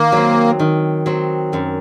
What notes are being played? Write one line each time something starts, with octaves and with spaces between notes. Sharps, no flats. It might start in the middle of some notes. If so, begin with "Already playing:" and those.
Already playing: D#3 A#3
F#3 C4
D#3
F#3 C4
F#2